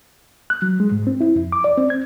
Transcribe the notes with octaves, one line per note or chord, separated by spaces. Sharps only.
F#6
F#3
G#3
G#2
C4
E4
F2
D6
D5
C4
G#6